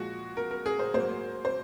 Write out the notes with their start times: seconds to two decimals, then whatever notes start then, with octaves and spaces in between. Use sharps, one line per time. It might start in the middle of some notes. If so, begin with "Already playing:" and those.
Already playing: A#2 F3 G#3 F#4
0.37 A#4
0.51 A#4
0.66 G#4
0.79 C5
0.94 G#2 F#3 A#3 C5
1.45 C5